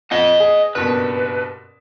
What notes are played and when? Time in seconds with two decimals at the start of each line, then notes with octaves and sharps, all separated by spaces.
0.11 F2 D#5 F#5
0.40 G#4
0.75 F#1 G2 B2 B4